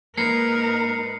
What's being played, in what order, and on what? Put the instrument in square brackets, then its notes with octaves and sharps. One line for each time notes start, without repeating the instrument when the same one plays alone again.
[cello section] G#2 D#4 B4 [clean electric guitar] A#3 [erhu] A#4 [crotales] C7 C#7